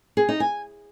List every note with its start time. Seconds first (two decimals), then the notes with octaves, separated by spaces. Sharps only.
0.17 G#4
0.29 D#4
0.40 G#5